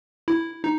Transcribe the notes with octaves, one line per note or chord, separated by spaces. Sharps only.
E4
D#4